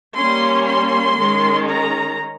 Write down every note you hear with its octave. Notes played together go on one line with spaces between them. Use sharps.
G3 A#3 C#4 C6
C6
D#3 G#3 C#4
A#5